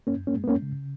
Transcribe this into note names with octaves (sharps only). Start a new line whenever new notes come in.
F#2 A#3 C#4
A#3 C#4
G#3
B3
A#3 C#4
C#3